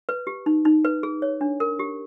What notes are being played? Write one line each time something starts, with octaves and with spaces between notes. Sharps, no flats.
B4
G4
D#4
D#4
B4
G#4
C#5
D4
A#4
G4